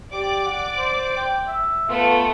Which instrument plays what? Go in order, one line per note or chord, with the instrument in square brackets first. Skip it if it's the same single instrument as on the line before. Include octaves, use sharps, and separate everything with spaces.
[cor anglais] G4 [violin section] D5 D6
[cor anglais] F#5
C5
G5
E5
[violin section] A3 B3 [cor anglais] F4